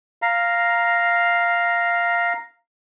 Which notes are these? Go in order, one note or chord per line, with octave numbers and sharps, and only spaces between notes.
F5 A#5